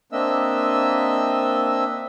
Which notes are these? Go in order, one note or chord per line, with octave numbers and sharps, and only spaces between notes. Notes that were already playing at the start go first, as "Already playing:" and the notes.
A#3 C4 D4 D#5 E5 E6